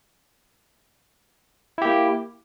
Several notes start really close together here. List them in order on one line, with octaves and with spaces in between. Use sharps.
E4 G4 A#3